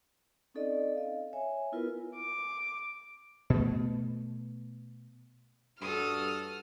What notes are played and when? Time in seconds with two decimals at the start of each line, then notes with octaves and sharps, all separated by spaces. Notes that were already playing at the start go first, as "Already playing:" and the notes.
0.54 C4 C#4 D#4 A4 D5 D#5
0.96 D#5 F5
1.33 C#5 E5 G#5
1.72 B3 E4 F4 A#4 B4
2.15 D6
3.50 B2 A3
5.81 G2 F#4 A4 D#6 F6